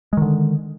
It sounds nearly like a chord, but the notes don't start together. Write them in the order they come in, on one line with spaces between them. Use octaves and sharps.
G#3 D#3 D3